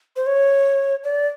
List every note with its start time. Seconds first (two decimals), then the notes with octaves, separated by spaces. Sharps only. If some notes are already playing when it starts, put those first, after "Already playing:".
0.16 C5
0.26 C#5
1.04 D5